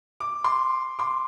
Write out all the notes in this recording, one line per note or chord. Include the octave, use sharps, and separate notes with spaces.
D6
C6 D6
C6 D6